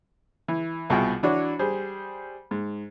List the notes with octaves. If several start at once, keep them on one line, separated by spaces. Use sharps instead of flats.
E3
C2 B2 F4 F#4 G#4 G5
E3 D4 F#4 C#5
G3 G#4 C5
G#2